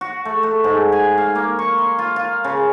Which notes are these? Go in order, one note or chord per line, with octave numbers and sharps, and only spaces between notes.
F#4
A3
A3
G#2
G#5
F5
A#3
C#6
C6
F4
F4
C#3